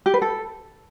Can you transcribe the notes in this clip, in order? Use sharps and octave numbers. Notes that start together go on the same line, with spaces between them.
G4
B4
A4